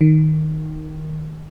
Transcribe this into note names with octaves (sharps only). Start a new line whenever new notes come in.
D#3